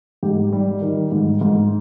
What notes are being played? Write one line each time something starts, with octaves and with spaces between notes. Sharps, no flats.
G#2 G4
G3
D#3
G#2
G#2